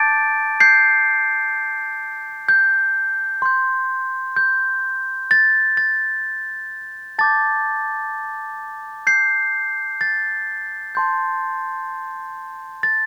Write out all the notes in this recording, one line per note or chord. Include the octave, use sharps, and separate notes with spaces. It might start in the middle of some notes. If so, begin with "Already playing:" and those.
Already playing: A5 D6 G6 A6 D7
G6 C7
G6
C6 G6
G6
A6
A6
A5 D6 G6 A6
G6 C7
A6
A5 C6 G6
A6